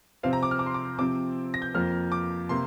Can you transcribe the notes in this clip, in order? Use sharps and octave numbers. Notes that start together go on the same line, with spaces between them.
C3 F3 C4 F5
A#5
D6
F6
D6
C6
D6
C3 F3 C4 D6
A#6
G6
F2 F3 A#3 F6
D6
C3 A#3 C6